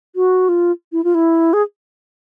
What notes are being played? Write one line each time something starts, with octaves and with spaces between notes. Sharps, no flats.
F#4
F4
E4
F4
E4
G#4